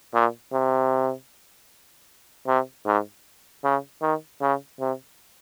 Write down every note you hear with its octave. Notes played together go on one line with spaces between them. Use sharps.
A#2
C3
C3
G#2
C#3
D#3
C#3
C3